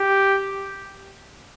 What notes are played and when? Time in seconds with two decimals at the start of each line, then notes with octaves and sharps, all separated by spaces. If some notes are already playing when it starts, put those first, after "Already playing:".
Already playing: G4